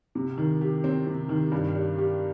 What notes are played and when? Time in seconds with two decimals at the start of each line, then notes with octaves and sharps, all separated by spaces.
0.15 C3
0.38 D#3
0.61 G4
0.84 C4
1.06 C3
1.29 D#3
1.52 G2
1.75 G3
1.98 G4